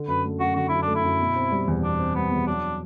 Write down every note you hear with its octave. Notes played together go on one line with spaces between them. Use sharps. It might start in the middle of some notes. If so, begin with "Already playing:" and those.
Already playing: D3
F#2 B4
A3
F#2 F#4
D3 F#4
F#2 E4
D4
A3
E4
F#2
B2
C4
G3
E2
B2 D4
C4
G3 B3
E2
F#3 D4